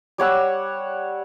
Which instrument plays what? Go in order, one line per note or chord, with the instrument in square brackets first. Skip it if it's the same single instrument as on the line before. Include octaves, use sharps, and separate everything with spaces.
[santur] G3 C#5 F#5 E6